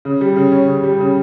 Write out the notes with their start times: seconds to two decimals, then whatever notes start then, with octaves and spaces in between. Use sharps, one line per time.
0.05 C#3
0.21 G3
0.36 C#3
0.52 C#4
0.68 C#3
0.84 G3
1.00 C#3